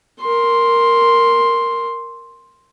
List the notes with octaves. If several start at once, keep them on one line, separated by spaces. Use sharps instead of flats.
A#4 C6